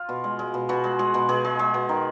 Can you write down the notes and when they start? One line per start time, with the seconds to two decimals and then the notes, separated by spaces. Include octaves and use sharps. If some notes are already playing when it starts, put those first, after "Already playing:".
Already playing: F4
0.09 B2
0.24 G#3
0.39 G#3
0.54 B2
0.69 B2 F#4
0.84 G#3
0.99 G#3 G#4
1.14 B2
1.29 B2 G#4
1.44 G#3
1.59 G#3
1.74 B2
1.89 D#3